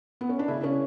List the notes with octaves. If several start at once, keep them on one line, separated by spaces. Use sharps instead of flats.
B3
C#4
D4
C#3 E4
C#4